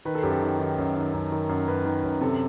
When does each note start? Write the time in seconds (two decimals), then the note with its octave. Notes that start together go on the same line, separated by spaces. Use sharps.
0.05 D#3 B4
0.15 A4
0.23 F#2 G4
0.31 A4
0.42 D#3
0.59 D#3
0.78 F#2
0.96 D#3
1.13 F#2
1.32 D#3
1.49 F#2
1.68 F#2 B4
1.85 D#3
2.04 F#2
2.21 C3 A4